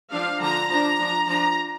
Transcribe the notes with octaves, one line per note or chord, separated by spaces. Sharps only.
F3 D4 F5
D3 F3 D4 A#5
F3 D4 A#5
F3 D4
F3 D4 A#5